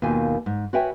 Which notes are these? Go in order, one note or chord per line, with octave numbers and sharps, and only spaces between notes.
D#2 B2 D#3 F4 G#5
G#2
F#4 B4 C#5 E5 G5 G#5